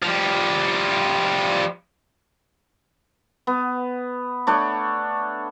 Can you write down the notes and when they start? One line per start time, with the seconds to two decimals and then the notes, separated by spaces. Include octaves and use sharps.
0.03 F3 G3
3.47 B3
4.47 A3 D4 C#5